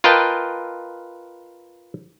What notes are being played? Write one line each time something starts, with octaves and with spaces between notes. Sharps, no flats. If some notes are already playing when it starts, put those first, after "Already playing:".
F4 A#4 B4 D#5 G5 A5